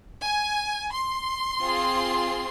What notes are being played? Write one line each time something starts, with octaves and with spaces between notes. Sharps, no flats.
G#5
C6
C4 F4 G#4